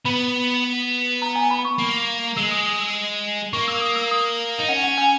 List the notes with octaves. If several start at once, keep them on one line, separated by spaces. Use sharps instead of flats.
B3 B5
A#5
G#5
B5
C#6
A#3
G#3 E6
D#6
D#6
E6
A#3 C#6
E6
D#6
E6
D#6
D#4
C#4 F#5
F#5
G#5